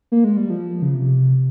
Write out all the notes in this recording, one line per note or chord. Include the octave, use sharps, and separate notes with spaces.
A#3
G#3
G3
F3
C#3
C3